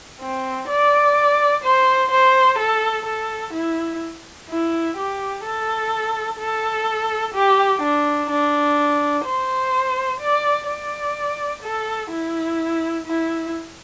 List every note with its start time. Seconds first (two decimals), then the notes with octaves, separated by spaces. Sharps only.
0.21 C4
0.68 D5
1.64 C5
2.11 C5
2.59 A4
3.06 A4
3.53 E4
4.49 E4
4.97 G4
5.45 A4
6.40 A4
7.34 G4
7.82 D4
8.30 D4
9.25 C5
10.20 D5
10.68 D5
11.63 A4
12.11 E4
13.06 E4